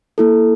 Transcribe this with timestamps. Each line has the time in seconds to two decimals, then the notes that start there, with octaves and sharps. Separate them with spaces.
0.18 A#3 E4 A4